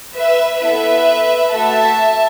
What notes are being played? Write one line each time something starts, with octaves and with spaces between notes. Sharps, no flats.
B4 E5
B3 E4 A4 B4 E5
A3 F#4 A4 E5 A5